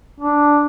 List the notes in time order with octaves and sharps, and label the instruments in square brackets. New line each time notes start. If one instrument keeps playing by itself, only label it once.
[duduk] D4